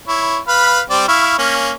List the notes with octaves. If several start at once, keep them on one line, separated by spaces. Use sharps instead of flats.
E4 C#5
B4 F5 B5
G3 C4 D5
E4 F5 C#6
A#3 C#4